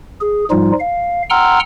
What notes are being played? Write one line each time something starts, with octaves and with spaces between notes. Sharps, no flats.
G#4
G#2 F3 G3 D#4 F4
F5
F#5 G5 A#5 C6 E6 F6